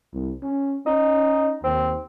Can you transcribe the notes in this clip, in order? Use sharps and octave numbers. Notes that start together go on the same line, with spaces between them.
C2
C#4
C#4 D#4
D#2 C4